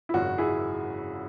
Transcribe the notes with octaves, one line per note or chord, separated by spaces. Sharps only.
E4
G#1 F#2 C#3 G#3 F#4
E4 G#4